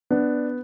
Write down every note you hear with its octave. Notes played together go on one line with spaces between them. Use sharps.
B3 D4